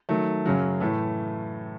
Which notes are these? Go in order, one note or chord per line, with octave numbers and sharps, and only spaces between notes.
D#3 F#3 A3
F#2 C#3 F#3
A2 E3 A3